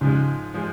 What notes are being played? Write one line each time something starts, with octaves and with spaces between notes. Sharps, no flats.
G#2 C#3 F3 G#3
F3 G#3